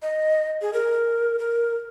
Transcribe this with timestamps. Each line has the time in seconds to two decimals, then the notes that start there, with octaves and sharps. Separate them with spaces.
0.02 D#5
0.62 G#4
0.73 A#4
1.39 A#4